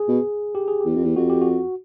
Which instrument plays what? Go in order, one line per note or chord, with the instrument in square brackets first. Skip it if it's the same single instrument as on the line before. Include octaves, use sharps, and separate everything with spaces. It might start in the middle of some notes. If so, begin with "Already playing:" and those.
Already playing: [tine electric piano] G#4
[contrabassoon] B2
[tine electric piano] G4
G#4
[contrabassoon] E2 [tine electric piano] G4
[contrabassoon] F2
E2
[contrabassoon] F2 [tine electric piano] F#4
[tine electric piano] G4
F#4